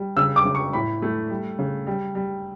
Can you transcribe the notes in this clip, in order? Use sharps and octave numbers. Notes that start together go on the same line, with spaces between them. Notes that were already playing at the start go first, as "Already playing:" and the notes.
Already playing: G3
C#3 E6
D6
C#3
C#6
A2 B5
A3
G3
C#3
G3
G3